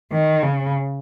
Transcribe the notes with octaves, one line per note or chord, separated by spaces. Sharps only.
D#3
C#3